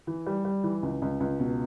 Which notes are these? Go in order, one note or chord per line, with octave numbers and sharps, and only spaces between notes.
E3
G3
G3
E3
C#2
C#2
C#2
B2